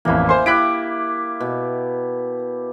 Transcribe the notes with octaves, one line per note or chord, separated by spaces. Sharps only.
A1 F2 E3 A#3 E4
C5 G#5 C6
E4 G4 F#6 B6 D7
B2